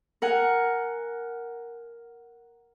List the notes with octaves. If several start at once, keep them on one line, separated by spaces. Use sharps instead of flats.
A#4 F#5 G#5